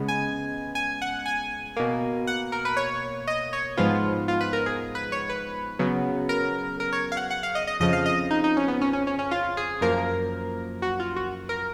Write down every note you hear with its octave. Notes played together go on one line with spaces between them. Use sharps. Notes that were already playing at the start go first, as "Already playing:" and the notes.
Already playing: C#3 G#3 B3
G#5
G#5
F#5
G#5
B2 A#3
F#5
A#4
B4
C#5
D#5
C#5
G#2 F3 G#3 B3 F4
F4
B4
A#4
G#4
B4
C#5
B4
C#3 F#3 B3
A#4
A#4
C#5
F5
F#5
F#5
F5
D#5
D#5
F2 C#3 F3 D#5
F5
D#5
D#4
D#4
C#4
B3
C#4
C#4
C#4
C#4
F4
G#4
F#2 F3 A#3 A#4
F#4
F4
F#4
A#4